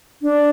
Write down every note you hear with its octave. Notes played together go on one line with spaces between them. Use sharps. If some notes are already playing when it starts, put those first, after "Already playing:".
D4